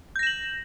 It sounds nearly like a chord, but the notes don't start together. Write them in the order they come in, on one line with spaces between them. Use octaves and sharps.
G6 A#6 E7 F#7